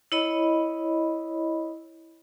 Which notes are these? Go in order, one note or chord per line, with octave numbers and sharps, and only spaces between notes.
E4 C#5 D#5 B5